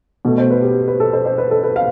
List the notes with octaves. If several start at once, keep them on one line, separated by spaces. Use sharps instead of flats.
B2 A3
C5
B4
G4
B4
A4
C5
C5
B4
A4
B4
F5